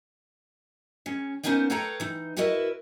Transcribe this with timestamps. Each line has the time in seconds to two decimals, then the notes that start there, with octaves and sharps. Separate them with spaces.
1.06 C#3 C#4
1.43 A#3 B3 C#4 D#4 B4 C5
1.70 A4 B4 C#5 F5 G5 A#5
2.00 E3 D#4
2.37 E4 F#4 A#4 B4 D#5 E5